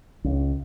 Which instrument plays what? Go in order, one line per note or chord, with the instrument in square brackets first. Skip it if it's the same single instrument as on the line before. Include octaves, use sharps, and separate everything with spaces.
[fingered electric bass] C#2